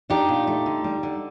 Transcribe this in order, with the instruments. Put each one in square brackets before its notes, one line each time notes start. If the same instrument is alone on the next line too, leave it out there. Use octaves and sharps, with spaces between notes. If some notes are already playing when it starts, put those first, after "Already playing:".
[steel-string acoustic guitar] D4 D#4 G4
A#2
A3
D3
G3
D3